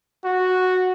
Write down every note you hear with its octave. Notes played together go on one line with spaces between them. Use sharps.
F#4